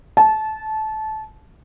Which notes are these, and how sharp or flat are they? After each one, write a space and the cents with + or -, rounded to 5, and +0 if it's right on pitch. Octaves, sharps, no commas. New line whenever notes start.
A5 -20